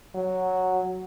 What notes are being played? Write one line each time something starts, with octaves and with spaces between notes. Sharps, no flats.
F#3